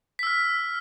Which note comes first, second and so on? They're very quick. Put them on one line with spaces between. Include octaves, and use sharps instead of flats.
B6 E6 F6